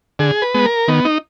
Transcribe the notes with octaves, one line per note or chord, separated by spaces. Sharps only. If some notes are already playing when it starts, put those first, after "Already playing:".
D3 G#4
B4
G#3 B3
A#4
D#3 B3
D#4